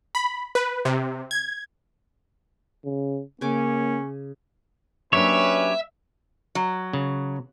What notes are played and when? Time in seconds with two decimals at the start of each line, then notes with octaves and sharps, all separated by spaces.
0.15 B5
0.55 B4
0.85 C3
1.31 G#6
2.85 C#3
3.41 C#3 A#3 C#4 G#5 D6
5.13 F#3 A#3 C#4 D4 G4 B4 C#5 E5
6.55 F#3
6.93 C#3